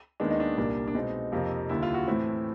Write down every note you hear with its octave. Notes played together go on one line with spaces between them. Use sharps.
D#2 D#3 G#3 B3 D4
D#4
D4
C2 A#2 G3 A#3
D4
B2 G#3 C4 D#4
F2 C3 F3 A#3
D#2 D3 G3 E4
F4
F#4
A2 E3 A3 C4 E4